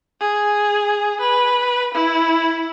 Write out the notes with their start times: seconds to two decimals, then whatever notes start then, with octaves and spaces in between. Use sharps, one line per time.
0.21 G#4
1.21 B4
1.94 E4